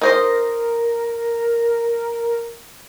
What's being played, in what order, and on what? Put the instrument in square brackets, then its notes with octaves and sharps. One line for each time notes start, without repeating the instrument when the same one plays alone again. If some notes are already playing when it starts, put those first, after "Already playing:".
[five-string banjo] D#4 C5 D#5 [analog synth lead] A#4